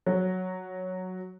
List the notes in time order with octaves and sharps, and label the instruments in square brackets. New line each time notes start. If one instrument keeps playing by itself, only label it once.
[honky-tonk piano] F#3